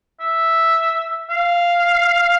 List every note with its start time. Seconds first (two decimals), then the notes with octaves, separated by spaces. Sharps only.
0.20 E5
1.30 F5